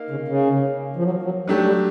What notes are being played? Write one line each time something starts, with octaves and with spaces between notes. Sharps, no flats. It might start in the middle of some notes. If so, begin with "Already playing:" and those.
Already playing: A#3 D#4 F5
C#3
C#3
F3
F#3
F3
F#3
F#3 G3 A3 D4 G4
G3